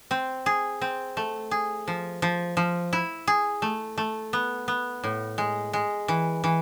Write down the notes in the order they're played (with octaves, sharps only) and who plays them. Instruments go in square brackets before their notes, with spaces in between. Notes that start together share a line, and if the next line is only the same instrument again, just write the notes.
[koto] C4
G#4
C4
A3
G#4
F3
F3
F3
E4
G#4
A3
A3
B3
B3
A2
G#3
G#3
E3
E3